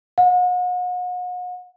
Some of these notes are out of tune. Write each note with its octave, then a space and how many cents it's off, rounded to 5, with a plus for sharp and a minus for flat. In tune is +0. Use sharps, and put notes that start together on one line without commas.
F#5 -40